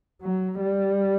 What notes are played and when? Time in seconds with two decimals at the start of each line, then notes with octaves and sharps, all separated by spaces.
0.22 F#3
0.61 G3